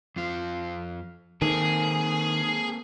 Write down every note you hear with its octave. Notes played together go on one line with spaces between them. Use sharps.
F2 F4
D#3 A#3 C4 G#4 A4